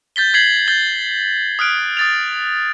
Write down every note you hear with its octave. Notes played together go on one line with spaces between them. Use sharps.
G6 A6 B6 G7
G#6 B6 C7 F#7
G6 A6 G7
D#6 F6 F#6 D7
D#6 A6 F7